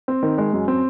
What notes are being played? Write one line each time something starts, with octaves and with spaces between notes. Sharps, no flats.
C4
D#3
G#3
F#2
C4